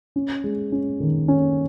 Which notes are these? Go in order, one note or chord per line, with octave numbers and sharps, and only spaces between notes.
C#4
G#3
C#4
D#3
C#4